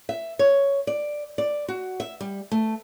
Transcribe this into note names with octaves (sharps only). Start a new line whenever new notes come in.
E5
C#5
D5
D5
F#4
E5
G3
A3